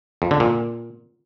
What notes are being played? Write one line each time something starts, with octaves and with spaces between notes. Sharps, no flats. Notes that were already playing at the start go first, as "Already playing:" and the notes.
F2
D3
A#2